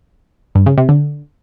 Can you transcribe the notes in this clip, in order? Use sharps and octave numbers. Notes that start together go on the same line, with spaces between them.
G2
C#3
C3
D3